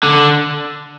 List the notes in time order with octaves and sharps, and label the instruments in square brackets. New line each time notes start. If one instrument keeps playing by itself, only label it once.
[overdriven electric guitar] D3